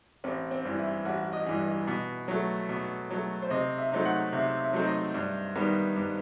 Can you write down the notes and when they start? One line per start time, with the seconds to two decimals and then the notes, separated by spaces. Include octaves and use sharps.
0.24 A1 C4
0.51 C4
0.65 G2 E3
0.78 E4
1.05 A1 F#4
1.33 D#5
1.46 G2 E3
1.60 D#5
1.87 B2
2.28 F#3 A3
2.69 B2
3.10 F#3 A3
3.42 C5
3.50 C3 D#5
3.78 E5
3.92 F#3 A3 C4 D#4
4.05 F#5
4.33 C3 E5
4.60 E5
4.73 F#3 A3 C4 D#4 C5
4.87 D#5
5.14 G2
5.55 D#3 G3 B3
5.96 G2